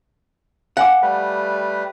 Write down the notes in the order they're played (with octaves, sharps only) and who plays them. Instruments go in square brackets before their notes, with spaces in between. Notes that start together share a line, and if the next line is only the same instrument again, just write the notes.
[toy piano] F5 G#5 D6 [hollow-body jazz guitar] F#5
[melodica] G3 A3 B4